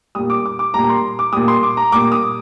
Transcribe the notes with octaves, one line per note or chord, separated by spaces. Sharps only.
A#2 G3 D#6
D6
D6
D6
A#2 G3 A#5
A#5
C6
D6
A#2 G3 D#6
C6
D6
A#5
A#2 G3 D6
D#6